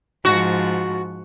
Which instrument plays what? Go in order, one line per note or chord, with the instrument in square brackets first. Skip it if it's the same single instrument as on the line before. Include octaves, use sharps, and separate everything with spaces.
[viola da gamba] G#2 F3 [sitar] F#4